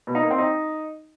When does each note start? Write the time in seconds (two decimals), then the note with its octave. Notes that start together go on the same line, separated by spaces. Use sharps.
0.07 B2
0.15 D#4
0.23 A#3
0.31 C4
0.38 D#4